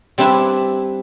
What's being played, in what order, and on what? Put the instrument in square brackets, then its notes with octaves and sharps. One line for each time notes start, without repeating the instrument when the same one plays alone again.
[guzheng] G3 C4 D4 E4 B4